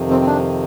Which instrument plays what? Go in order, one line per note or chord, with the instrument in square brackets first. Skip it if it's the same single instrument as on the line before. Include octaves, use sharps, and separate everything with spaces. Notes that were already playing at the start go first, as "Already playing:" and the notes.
Already playing: [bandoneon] F2 C3 D#3
C4
C4
D4